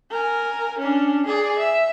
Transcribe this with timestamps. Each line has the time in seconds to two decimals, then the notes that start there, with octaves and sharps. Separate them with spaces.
0.11 A#4 G#5
0.78 C#4 D4
1.26 G#4 D5
1.59 E5